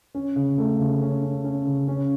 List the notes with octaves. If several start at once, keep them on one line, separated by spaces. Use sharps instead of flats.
C#4
C#3
A3
C#3
C#4
C#4
C#4
C#3
C#4